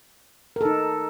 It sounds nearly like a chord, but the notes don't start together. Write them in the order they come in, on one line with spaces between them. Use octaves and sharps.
A#4 A4 D#4